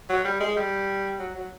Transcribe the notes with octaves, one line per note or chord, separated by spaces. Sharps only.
F#3
G3
G#3
G3
F#3
F#3